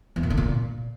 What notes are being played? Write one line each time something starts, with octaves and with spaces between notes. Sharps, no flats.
E2
A#2
D3
A#2